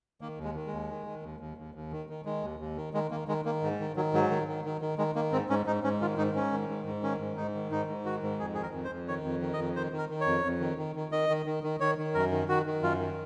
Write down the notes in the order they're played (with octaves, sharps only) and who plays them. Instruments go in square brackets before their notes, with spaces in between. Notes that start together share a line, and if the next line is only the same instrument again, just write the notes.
[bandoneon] D#3 A#3
D#2
G#3
D#3
G#3
D#2
D#3
D#3
D#2
D#2
D#2
D#2
D#3
D#3
D#3 G#3
D#2
D#2
D#3
D#3 G#3
D#3 A#3
D#3 G#3
D#3 A#3
G#2
D#3
D#3 F#3
G#2 F#3
D#3
D#3
D#3
D#3
D#3 G#3
D#3 A#3
G#2 C4
G#2 C#4
G#2 D#4
G#2 C#4
D#3 F4
G#2 D#4
G#2 C#4
D#3
G#2
G#2
D#3 C#4
G#2
G#2 D#4
D#3
G#2 D#4
G#2
D#3 F#4
G#2
F2 G#4
D#3 G#4
A#4
F2
C5
F2
D#3 C#5
F2
D#3
D#5
F2
D#3 C5
D#3
A#4
D#3
C#5
F2
F2
D#3
D#3
D#3
D#3 D#5
D#3
D#3
D#3
D#3 C#5
D#3
F#2 A#4
D#3
D#3 F#4
D#3
F#2 F4
D#3